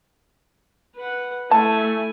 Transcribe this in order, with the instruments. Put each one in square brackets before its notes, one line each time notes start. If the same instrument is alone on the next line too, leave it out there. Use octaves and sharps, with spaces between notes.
[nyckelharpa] B4 F#5
[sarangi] A3 [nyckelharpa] E4 G#5 [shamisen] A5